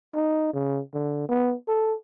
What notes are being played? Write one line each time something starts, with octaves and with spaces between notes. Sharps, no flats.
D#4
C#3
D3
B3
A4